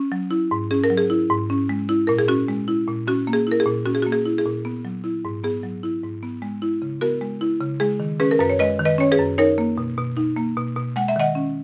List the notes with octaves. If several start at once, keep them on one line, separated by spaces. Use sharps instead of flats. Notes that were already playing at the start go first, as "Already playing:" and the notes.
Already playing: C#4
F#3
E4
G#2
C#4 G#4
A#4
F#3
G#4
E4
G#2
C#4
G#3
E4
A#2 A#4
G#4
C#4 F#4
G#3
E4
A#2
C#4 F#4
A#3
G#4
E4 A#4
G#4
A#2
C#4 F#4
G#4
F#4
A#3
G#4
E4
G#4
A#2
B3
F#3
E4
G#2
B3 G#4
F#3
E4
G#2
B3
G#3
E4
C#3
B3 F#4 A#4
G#3
E4
C#3
G#3 G#4
D#3
C#4 G#4 B4
A#4
F#2 B4
C#5
G#3 B4 D#5
D#3
B4 D#5
C#4 C#5
G#4 B4
F#2
D#4 A#4 C#5
A#3
B2
B2
D#4
A#3
B2
B2
G#3 F#5
E5
D#3 D#5 F#5
C#4